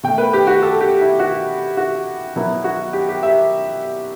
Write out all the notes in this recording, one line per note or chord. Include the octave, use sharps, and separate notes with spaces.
B2 A3 G5
B4
G4
F#4
A4
G4
E4
F#4
F#4
B2 F#3 B3 E4
F#4
G4
G4
E5